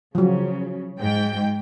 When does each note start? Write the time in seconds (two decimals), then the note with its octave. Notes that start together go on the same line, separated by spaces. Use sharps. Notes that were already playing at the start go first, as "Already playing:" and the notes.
0.15 C#3 F3 F#3
0.99 G#2 G5